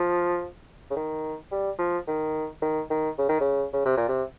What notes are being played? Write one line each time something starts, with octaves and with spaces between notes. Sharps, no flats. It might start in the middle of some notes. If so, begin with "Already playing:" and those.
Already playing: F3
C#3
D#3
G3
F3
D#3
D#3
D#3
C#3
D#3
C#3
C#3
C3
A#2
C3